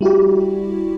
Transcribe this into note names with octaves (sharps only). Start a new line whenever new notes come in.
G3 E4 F#4 G4